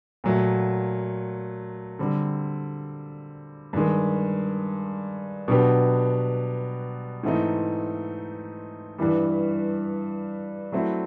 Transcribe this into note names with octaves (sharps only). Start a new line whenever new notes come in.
A#2 F#3 A3
D3 G3 C4
G2 D#3 G#3
B2 F#3 B3 D4 G4
G#2 E3 A3 C4 D#4
G2 E3 G3
F#3 A3 C4 E4